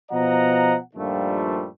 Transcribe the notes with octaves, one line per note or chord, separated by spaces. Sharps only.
B2 F3 D#5 F#5 A#5
G2 A#2 D#3 F3 G3 A3